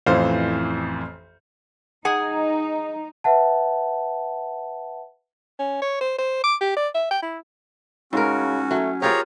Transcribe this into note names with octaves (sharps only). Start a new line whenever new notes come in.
A1 F2 E3 C5 F5
D#4 G#4 F#5 G#5
B4 E5 F#5 A5
C#4
C#5
C5
C5
D6
G4
D5
E5
G5
E4
G#2 C#3 C#4 F#4 A#4
F#3 A3
F3 A#3 F4 G4 G#4 C#5 A#5